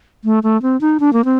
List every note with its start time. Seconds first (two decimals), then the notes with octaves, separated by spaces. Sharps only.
0.24 A3
0.43 A3
0.62 C4
0.81 D#4
1.00 D4
1.13 A#3
1.25 C4